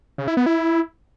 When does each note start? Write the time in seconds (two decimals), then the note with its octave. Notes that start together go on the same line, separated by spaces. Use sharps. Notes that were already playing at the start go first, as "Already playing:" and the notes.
0.18 C#3
0.28 E4
0.37 B3
0.46 E4